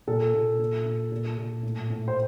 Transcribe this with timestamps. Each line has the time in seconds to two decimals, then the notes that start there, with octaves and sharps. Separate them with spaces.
0.07 A#2 A4
0.34 A#2
0.59 A#2
0.86 A#2
1.12 A#2
1.37 A#2
1.63 A2
1.90 A2
2.08 C5